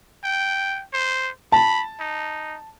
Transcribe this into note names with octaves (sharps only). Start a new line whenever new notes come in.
G5
C5
A5 B5
D#4